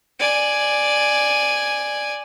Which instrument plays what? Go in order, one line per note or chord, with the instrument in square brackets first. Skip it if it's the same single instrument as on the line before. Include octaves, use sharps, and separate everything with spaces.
[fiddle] D5 G#5